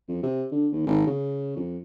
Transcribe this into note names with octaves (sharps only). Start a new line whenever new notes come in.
F2
C3
D3
D#2
G#1
C#3
F2